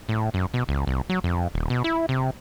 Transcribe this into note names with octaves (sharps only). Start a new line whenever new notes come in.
A2
F#2
B2
C#2
C2
F#3
F2
D#1
B2
E4
C3